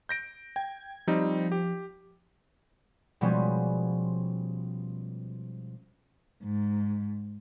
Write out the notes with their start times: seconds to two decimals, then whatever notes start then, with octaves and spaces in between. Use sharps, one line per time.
0.09 G6 A#6 D7
0.56 G5 G#6
1.07 F3 G3 C4 D#4
1.52 G4
3.21 B2 F3 G3 G#3 B3 C#4
6.43 G#2